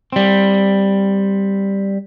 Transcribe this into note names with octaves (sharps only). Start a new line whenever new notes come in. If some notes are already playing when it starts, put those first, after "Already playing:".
G3 C4